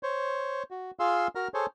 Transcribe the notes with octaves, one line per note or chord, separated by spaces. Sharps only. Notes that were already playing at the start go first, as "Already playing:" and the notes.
C5 C#5
F#4
F4 G#4 F5 C6 E6
F#4 A#4 A#5 F6
G#4 A4 C5 C#5